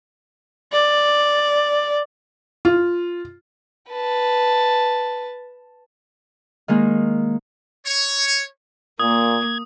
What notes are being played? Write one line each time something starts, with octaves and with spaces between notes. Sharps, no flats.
D5
F4
B4 A5
D#3 G#3 A#3
C#5
A#2 A#3 D#6 G#6